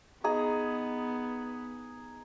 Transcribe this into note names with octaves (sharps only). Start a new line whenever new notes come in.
B3 D#4 G#4 A#5